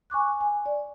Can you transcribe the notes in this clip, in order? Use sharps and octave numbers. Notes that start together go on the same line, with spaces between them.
G#5 C#6 D6 F#6
G#5
D5